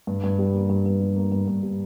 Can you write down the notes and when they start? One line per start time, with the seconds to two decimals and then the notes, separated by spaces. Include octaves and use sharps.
0.07 G2
0.24 G2
0.39 G3
0.54 A#3
0.70 G2
0.86 G2
1.01 G3
1.16 A#3
1.32 G2
1.48 G2
1.63 G3